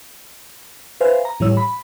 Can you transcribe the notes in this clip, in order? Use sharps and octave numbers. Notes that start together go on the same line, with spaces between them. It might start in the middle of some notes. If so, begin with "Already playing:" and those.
B4 C5 E5 F5 G#5
A#5
A2 E3 G3 C#5 E6
B5